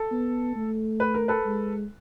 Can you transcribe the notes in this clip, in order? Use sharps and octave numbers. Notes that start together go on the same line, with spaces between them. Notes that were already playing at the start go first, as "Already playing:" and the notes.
Already playing: A4
B3
A3
B4
A#4
A4 B4
G#3